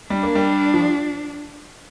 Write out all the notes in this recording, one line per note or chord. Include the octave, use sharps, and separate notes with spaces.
G3 D4
A#3
G3
F3